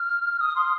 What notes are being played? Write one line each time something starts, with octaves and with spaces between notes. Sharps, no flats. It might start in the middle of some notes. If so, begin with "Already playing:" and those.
Already playing: F6
D#6
C6